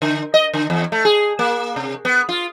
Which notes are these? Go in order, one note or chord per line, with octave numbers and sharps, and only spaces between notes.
D3
D#5
D3
E2
A3
G#4
A#3
C3
B3
F4